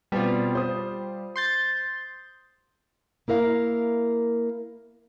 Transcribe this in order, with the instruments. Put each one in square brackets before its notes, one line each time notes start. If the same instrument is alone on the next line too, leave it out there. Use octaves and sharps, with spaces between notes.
[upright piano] B2 C4 [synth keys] G3 F4
[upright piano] C5 D#6
[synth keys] C6 G6 A6
[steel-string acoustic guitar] A#3 E4 A#4 F5